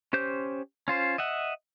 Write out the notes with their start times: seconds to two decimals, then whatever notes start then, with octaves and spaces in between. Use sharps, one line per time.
0.13 C#4 G4 C5 G6
0.88 C#4 F4 C5
1.18 D#5 E5 F#5